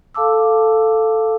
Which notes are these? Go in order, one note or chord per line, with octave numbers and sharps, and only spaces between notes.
A4 F5 A5 D6 E6